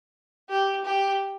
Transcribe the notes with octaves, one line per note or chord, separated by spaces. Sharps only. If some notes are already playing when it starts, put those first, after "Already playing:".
G4
G4